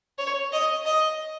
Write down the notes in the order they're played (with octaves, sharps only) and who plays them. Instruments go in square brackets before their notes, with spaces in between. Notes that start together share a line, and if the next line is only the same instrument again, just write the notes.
[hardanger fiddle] C#5
D#5
D#5